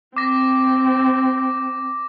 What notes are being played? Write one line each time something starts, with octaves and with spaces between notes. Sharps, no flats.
C4 D6 A#6